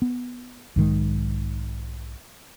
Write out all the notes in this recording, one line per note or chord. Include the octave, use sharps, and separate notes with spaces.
B3
B1 G#2 D#3 G#3